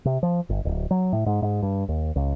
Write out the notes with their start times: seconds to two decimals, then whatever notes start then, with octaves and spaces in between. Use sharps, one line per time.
0.05 C3
0.23 F3
0.49 G1
0.65 D1
0.91 F#3
1.13 A2
1.26 G#2
1.42 G#2
1.63 G2
1.89 D#2
2.16 C#2